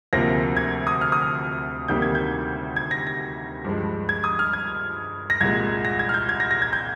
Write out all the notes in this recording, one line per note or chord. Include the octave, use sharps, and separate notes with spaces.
D2 C3 F3 A#3 A#6
G#6
D#6
F6
D#6
F6
D2 C3 D#3 G3 A#3 G6
G#6
G6
G#6
A#6
A#6
G2 F3 G#3
G#6
D#6
F6
G#6
A#6
C2 A#2 G#3 G#6
A#6
G#6
F6
G6
G#6
A#6
A#6
G#6
G6